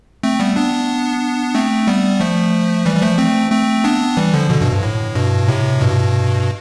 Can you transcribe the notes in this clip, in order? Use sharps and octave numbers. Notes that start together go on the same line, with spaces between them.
A3 C4
G3 B3
B3 D4
A3 C4
G3 B3
F3 A3
E3 G3
G3
F3 A3
A3 C4
A3 C4
B3 D4
E3 G3
D3 F3
B2 D3
G2 B2
G2
A2
G2 B2
A2 C3
G2 B2